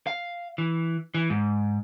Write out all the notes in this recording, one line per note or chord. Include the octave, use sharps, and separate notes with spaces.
F5
E3
E3
G#2